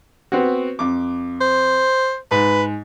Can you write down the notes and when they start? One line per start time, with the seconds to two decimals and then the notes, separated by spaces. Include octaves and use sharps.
0.32 B3 C4 F#4
0.79 F2 D6
1.41 C5
2.31 G#2 B4